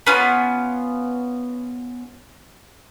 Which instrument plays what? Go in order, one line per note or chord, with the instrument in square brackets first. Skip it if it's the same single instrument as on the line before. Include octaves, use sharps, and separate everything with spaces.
[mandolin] B3 C#4 F4